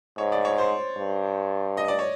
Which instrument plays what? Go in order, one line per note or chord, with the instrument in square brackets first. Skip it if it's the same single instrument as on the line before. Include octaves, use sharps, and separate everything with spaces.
[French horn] G#2 [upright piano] C#5
[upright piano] D5
C#5
C5
[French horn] G2
[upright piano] D#5
D5
C#5